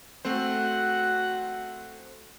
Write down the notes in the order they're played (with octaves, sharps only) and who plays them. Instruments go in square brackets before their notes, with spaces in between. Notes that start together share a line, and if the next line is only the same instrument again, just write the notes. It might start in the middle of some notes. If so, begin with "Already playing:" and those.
[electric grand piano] A3 C4 C5 [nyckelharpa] F#4 F#5